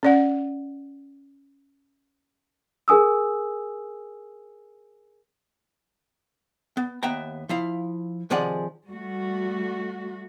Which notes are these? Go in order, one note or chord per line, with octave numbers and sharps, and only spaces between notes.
C#4 D5 F#5
G#4 A#4 G#5 D#6 E6
B3
D#2 B3 E5 G5 A#5
F3 E4 F5
C3 D#3 F3 G#4 D5 F#5
G3 A3 F#4